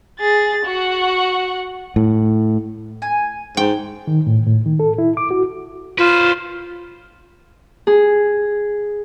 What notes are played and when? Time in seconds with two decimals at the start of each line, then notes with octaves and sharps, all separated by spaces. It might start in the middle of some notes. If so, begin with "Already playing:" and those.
0.20 G#4 A6
0.65 F#4 F#5
1.96 A2
3.02 G#5
3.57 G#2 G5
4.07 D#3
4.27 A2
4.47 A2
4.66 D#3
4.80 A4
4.98 E4
5.17 D6
5.31 F#4
5.98 F4 B4 C5
7.87 G#4